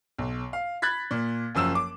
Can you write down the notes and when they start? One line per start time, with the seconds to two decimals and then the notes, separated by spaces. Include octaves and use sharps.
0.18 B1
0.53 F5
0.82 B5 F#6 G#6 A6 B6
1.11 A#2
1.55 F#1 F#2 F3 E6 E7
1.75 D6